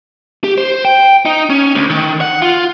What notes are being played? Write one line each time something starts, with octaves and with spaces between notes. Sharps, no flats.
G4
C5
G5
D#4
C#4
D2
D#3
F#5
F4